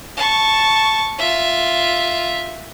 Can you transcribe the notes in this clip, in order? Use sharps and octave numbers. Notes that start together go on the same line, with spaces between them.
A5 C#6
F4 E5